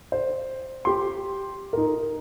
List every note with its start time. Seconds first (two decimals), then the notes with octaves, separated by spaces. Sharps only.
0.12 C5
0.85 G4 C6
1.73 D#4 A#4